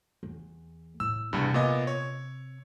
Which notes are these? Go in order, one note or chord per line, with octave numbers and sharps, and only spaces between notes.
E2
A2 E6
E2 G2 C3 C4
A#2 B3 D#5
C#5